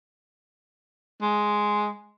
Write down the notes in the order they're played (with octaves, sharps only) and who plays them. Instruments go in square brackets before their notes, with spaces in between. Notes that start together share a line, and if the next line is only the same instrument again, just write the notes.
[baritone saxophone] G#3